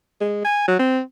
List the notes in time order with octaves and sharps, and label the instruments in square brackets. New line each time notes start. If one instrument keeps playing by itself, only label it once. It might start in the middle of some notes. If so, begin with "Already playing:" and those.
[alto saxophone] G#3
G#5
F#3
C4